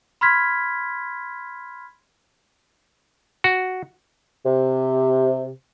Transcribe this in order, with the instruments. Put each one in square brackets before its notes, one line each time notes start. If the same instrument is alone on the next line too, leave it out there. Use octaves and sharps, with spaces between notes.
[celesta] B5 C6 F6 G#6 B6
[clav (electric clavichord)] F#4
[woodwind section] C3